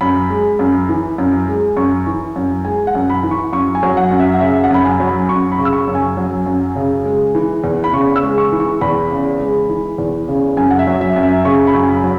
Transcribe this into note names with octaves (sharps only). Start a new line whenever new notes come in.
F#2 B5
G#3
F#2
E3
F#2
G#3
F#2 C#6
E3
F#2
G#3 G#5
F#5
F#2
B5
E3
C#6
F#2 C#6
G#5
F#3
F#5
F#2
E5
F#5
C#3 E5
F#5
F#2 B5
G#5
F#3
B5
F#2 C#6
B5
C#3
E6
C#6
F#2
G#5
F#3
F#2
C#3
G#3
E3
E2
B5
C#3 C#6
E6
G#3
C#6
E3
C#6
E2 B5
C#3
G#3
E3
E2
C#3
F#2 G#5
F#5
E5
F#3
E5
F#2
E5
C#3 C#6
B5
F#2
G#5
B5
F#3